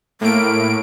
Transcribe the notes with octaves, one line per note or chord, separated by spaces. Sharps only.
A2 A#3 D7